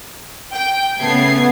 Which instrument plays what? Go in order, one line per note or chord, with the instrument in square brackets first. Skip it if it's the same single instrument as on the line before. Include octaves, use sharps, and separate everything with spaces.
[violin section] G5
[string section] C#3 B3 [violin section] A3 G#6 C7